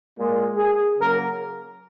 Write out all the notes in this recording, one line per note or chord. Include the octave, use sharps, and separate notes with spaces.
A#2 G#3
G#4
C#3 F#3 A#3 A#4